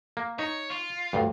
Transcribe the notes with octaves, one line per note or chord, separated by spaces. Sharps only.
A#3
D#4 C#5
F4
D2 G2